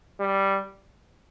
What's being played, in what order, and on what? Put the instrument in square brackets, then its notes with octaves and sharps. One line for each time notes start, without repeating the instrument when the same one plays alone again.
[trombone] G3